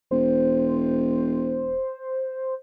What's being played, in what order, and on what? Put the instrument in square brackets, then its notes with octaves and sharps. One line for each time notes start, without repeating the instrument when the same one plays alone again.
[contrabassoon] E1 [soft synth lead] C5